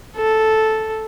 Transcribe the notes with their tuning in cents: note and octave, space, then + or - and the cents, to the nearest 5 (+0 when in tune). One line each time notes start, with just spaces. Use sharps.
A4 -5